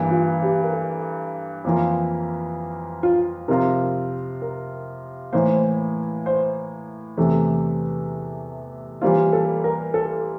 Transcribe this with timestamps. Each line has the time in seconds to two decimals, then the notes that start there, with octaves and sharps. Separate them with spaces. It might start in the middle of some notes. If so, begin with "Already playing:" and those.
Already playing: G2 E3 A#3
0.11 F4
0.42 G4
0.63 A#4
0.73 A4
1.64 F2 E3 A#3 F4
3.03 F4
3.48 C3 F3 C4 F4 A#4
4.42 A#4
5.33 A2 E3 A#3 C5
6.26 C5
7.17 E2 C3 E3 A3
9.01 E3 G3 A#3 F4 C5
9.33 A4
9.64 A#4
9.94 A4